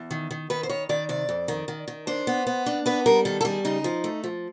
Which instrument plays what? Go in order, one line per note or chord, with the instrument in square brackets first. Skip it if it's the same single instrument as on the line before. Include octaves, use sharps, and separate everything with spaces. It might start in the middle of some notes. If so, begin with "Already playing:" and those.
Already playing: [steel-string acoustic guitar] E2
D#3
D#3
D#3 B4
C5
D#3 C#5
D#3 D5
C3 D5
F2
D#3
D#3
D#3
D4 C5
B3
B3
D4
B3 B4
G3 A#4
D#3 A4
A4
G3 G#4
C#3 D#4
F3
A3
F3